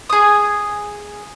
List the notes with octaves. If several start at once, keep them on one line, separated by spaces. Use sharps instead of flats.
G#4 D#6